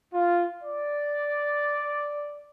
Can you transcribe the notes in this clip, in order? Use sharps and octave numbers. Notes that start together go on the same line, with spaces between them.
F4
D5